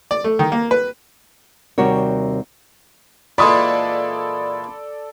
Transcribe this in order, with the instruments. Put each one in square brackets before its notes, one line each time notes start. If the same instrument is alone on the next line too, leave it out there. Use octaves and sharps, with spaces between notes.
[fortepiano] D5
A3
D#3
A#3
B4
[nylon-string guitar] D#2 C3 G3 F#4 A#4 C#5
[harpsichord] A#2 E3 G#3 [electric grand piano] A4 D5 [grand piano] B5 C6 D#6